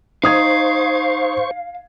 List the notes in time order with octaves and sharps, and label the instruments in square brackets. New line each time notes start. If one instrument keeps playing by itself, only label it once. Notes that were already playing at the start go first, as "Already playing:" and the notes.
[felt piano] D#4 D#6 G#6 [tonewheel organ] C5 C#6 [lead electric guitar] F5